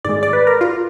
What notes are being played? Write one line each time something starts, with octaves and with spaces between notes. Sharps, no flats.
G#2 D#3 G#3 D5
D5
B4
A#4
F4